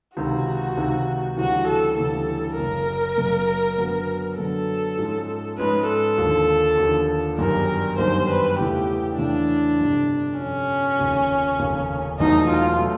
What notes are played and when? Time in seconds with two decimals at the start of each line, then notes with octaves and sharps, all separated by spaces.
0.17 C#2 C3 D#3 F#4
0.77 C#2 C3 D#3
1.37 D2 C#3 E3 G3 F#4
1.67 A4
1.97 D2 C#3 E3 G3 A4
2.57 F#1 F#2 C#3 A#4
3.18 F#1 F#2 C#3
3.78 F#2 D3 F#3 B3
4.38 F#2 D3 F#3 B3 A4
4.98 G#2 F3 G#3 C#4
5.58 G#2 F3 G#3 C#4 B4
5.88 A4
6.18 D#2 D3 F3
6.78 D#2 D3 F3
7.38 G1 F#2 D#3 G3 A#4
7.98 G1 F#2 D#3 G3 C5
8.29 B4
8.59 E2 C#3 E3 A3 G4
9.18 E2 C#3 E3 A3 D4
9.79 G1 F2 C3
10.39 G1 F2 C3 C#4
10.99 F1 D#2 C#3 F3
11.59 F1 D#2 C#3 F3
12.19 E1 E2 B2 F#3 A3 D#4
12.50 F4
12.79 B2 F#3 A3